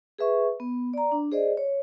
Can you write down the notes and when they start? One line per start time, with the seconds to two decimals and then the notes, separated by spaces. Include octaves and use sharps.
0.19 G#4 B4 E5 C#6
0.60 B3
0.94 D5 A#5
1.12 D4
1.32 G#4 C5 D5 D#5
1.57 C#5